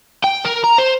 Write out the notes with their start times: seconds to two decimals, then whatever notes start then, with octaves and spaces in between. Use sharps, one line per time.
0.24 G5
0.44 A#4
0.64 A#5
0.78 C5